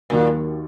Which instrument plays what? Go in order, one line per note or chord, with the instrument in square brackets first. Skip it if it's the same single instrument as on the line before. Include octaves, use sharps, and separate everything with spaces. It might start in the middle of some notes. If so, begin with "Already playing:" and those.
[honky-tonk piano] D#2 D#3 F#3 A#3 [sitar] A#2